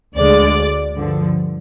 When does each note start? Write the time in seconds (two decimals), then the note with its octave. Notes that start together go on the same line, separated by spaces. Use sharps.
0.16 D2 D3 G#3 D5
0.95 G2 D3 F3